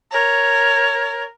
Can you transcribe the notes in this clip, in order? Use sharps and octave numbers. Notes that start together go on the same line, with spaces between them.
A#4 C#5